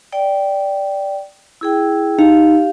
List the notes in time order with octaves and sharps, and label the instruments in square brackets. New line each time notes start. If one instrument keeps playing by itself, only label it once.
[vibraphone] D5 G5
E4 G#4 G5
[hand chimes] D#4 [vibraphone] G4 F5